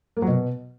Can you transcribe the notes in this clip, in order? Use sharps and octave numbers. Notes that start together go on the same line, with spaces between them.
A#3
F#3
B2